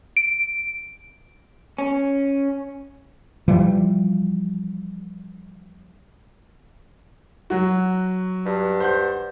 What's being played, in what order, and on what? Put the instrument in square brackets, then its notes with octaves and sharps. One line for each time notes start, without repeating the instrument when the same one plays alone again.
[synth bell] D7
[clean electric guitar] C#4
[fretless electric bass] E3 F3 G3
[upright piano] F#3 F#4
[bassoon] G2
[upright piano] C5 F#5 G6